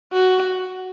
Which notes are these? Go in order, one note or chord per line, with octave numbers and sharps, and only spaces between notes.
F#4